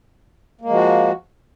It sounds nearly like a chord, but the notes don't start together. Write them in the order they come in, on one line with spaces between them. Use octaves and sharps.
A#3 G#3 F3 F#4